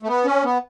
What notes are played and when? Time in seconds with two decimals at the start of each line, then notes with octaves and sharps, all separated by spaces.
0.02 A3
0.08 B3
0.25 C#4
0.44 B3